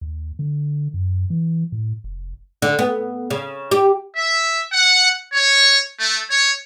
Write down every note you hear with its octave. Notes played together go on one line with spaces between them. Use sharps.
D#2
D3
F#2
E3
A2
F1
D3
B3
C#3
G4
E5
F#5
C#5
A3
C#5